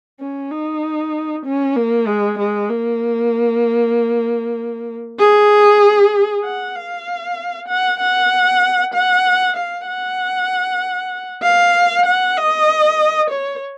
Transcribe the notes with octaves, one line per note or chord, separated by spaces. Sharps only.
C#4
D#4
C#4
A#3
G#3
G#3
A#3
G#4
F#5
F5
F#5
F#5
F#5
F5
F#5
F5
F#5
D#5
C#5